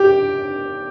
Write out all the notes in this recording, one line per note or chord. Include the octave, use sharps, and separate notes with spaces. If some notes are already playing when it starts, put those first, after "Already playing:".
Already playing: G4